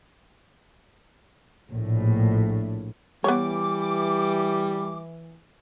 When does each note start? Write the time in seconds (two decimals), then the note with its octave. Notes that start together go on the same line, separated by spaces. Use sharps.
1.70 A#1 A2
3.24 E3 G3 B3 C#5 D6